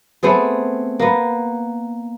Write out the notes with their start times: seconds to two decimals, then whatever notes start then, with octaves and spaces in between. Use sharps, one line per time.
0.23 A3 B3 C4 G#4
0.99 A#3 B3